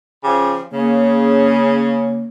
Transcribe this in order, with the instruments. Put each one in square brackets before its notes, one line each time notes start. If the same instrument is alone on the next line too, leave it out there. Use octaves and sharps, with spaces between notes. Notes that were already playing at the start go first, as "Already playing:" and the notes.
[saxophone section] C#3 F3 G4
[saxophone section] C#3 [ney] A#3